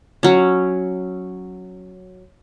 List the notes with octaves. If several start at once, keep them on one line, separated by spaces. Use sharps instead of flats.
F#3 C#4